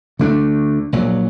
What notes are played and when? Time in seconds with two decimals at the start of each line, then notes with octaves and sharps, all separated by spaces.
0.19 D2 D3 A3 D4
0.93 A#1 A#2 F#3